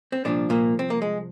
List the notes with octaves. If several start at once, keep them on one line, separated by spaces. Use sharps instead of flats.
C4
C2 A#2 D3 F3 D4
A#2 A#3
C4
A#3
G#3